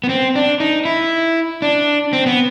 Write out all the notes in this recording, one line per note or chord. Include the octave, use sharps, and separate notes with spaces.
B3
C4
D4
D#4
E4
D4
C4
B3